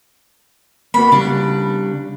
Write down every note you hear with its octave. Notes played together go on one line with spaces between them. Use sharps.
A#3 B3 F#4 B5
C#3 G3 D4